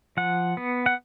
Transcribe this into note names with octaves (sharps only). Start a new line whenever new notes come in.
F3 F#5
B3
F#5